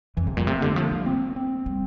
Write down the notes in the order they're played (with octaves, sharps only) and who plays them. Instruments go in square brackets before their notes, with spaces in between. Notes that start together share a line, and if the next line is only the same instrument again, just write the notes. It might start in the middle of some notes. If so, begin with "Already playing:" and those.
[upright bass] F2 [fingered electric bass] E3
[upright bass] G2 [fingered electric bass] C3
[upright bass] A#2 [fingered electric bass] G3
[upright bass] C3 [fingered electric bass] A3
[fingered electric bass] A#3
[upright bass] D3 [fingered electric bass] A3
[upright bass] F3 [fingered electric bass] A#3
[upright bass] G3
[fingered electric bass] C4
C4
[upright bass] G3